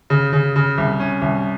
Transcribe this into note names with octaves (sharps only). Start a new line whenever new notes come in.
C#3
C#3
C#3
C2
C#4
C2